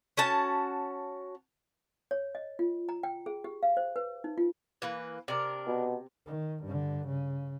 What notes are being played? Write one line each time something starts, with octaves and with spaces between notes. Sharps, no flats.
C#4 F#4 A5
C#5
D#5
F4
A#5
G5
G#4
G4
F5
C5
B4
D#4
F4
E3 A#3 B4
C3 D4 A#4
B2
D#3
G2 D3
C#3